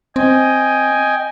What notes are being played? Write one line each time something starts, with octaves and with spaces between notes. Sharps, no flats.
C4 D#5 G5 G#5